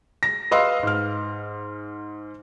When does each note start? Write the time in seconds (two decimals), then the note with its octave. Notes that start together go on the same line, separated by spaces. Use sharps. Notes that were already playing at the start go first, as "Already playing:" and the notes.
0.23 A#6
0.51 B4 D#5 F5 C6 E6
0.83 G#2 F6